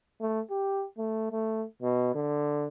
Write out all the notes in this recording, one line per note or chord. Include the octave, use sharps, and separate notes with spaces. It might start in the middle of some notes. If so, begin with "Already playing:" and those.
A3
G4
A3
A3
B2
D3